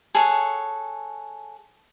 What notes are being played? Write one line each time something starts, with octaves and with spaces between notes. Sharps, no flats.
G#4 A4 C#5 F#5